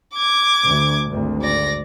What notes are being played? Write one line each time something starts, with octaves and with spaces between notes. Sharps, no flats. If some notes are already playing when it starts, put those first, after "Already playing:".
D6 G#6
D2
G#1 D2
D5 A#6